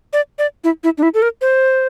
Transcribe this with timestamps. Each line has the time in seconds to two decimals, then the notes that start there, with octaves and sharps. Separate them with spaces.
0.13 D5
0.39 D5
0.64 E4
0.84 E4
0.98 D4
1.03 E4
1.14 A4
1.22 A#4
1.41 C5